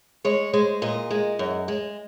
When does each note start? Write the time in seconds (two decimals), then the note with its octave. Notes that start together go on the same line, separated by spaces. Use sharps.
0.25 G#3 C#5
0.53 G#3 C5
0.82 A#2 D#5
1.11 G#3
1.39 F#2
1.68 G#3